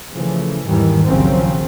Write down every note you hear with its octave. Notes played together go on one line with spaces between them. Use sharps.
C#3 E3 F3 A3
E2 G#2 D#3 E3 G3
A#1 D#2 C#3 F3 F#3 C4